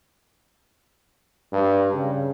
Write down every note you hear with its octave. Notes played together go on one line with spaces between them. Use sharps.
G2
C#3